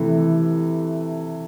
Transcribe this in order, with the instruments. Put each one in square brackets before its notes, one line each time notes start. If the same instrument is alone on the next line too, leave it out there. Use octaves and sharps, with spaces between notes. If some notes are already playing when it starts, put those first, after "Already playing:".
Already playing: [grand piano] C3 E3 A3